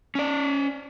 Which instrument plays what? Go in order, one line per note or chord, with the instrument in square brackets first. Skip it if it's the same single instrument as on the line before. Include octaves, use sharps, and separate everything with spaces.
[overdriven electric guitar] C#4 D5